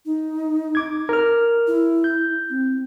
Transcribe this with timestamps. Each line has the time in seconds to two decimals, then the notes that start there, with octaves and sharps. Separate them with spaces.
0.06 D#4
0.75 D6 G#6
1.09 A#4 F6
1.67 E4
2.04 G6
2.50 C4